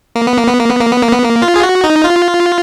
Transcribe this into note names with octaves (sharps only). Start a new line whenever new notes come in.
A#3
B3
A#3
B3
A#3
B3
A#3
B3
A#3
B3
A#3
F4
G#4
F#4
D#4
F4